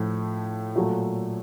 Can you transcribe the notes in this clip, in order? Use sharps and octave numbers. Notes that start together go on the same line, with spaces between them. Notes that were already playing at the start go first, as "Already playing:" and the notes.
Already playing: A2 F3 A3
A#2 F#3 A3